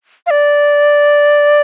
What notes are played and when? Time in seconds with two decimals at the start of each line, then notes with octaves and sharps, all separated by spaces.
0.27 F5
0.31 D5